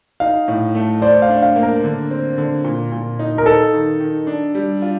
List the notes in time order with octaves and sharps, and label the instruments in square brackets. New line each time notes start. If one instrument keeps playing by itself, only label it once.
[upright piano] D#4 [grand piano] F5
[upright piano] A2
A3
[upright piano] C5 [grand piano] D5
[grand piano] F5
[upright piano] D4
[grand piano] F5
[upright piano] A#3
[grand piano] A#4
[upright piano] D3
C4
D3
A#2
A#2
D#4
[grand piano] A#4
[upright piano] D#4 [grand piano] A4
[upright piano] D#3
D#3
D4
G3
F4